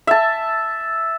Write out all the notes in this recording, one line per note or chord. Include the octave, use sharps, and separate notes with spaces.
E5 A5